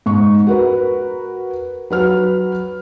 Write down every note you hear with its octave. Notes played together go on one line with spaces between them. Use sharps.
G#2 C#6
F#4 A#4 B4
F#3 B4 F6